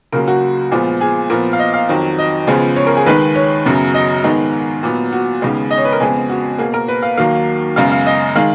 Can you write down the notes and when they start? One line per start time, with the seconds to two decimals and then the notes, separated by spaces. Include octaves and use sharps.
0.12 C#2 C#3 F#3 A#3 A#4
0.28 F#4
0.72 A#2 F3 G#3 B3
1.01 G#4
1.29 A#2 F3 B3 A#4
1.53 F5
1.59 D#5
1.74 F5
1.89 F2 D#3 F#3
2.19 D#5
2.47 C#2 C#3 F3 G#3 B3
2.76 C#5
2.87 A#4
2.97 G#4
3.06 D#2 D#3 G#3 B4
3.35 C#5
3.65 F#2 C#3 F#3 B3
3.94 D#5
4.24 G#2 D#3 G#3 B3
4.83 A#2 F#3 B3
5.12 F#4
5.42 D#2 C#3 G#3 B3
5.71 D#5
5.78 C#5
5.85 B4
5.92 A#4
6.00 F2 C#3 G#3 B3 G#4
6.29 F#4
6.58 B2 A#3 G#4
6.74 A#4
6.88 B4
7.03 F5
7.18 D#2 D#3 F#3 A#3 F5
7.76 F#2 C#3 G#3 B3 F5
7.92 F5
8.06 D#5
8.35 D#3 G#3 F5